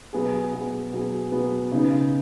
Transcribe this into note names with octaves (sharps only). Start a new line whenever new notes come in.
B2 F#3 B3 G#4
B2 F#3 B3 G#4
B2 F#3 B3 G#4
B2 F#3 B3 G#4
C#3 B3 D#4